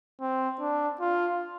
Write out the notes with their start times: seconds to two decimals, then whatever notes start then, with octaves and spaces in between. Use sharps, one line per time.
0.21 C4
0.60 D4
1.01 F4